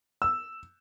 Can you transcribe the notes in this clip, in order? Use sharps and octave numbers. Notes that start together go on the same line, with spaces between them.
E6